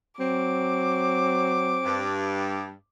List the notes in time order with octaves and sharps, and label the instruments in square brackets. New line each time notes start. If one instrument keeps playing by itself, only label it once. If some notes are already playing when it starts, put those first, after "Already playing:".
[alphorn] F#3 [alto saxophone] C4 [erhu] D6
[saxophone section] G2